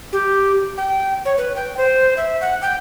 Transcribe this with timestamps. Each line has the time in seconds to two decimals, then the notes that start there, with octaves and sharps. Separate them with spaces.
0.13 G4
0.78 G5
1.25 C#5
1.38 B4
1.56 G5
1.77 C5
2.17 E5
2.41 F#5
2.62 G5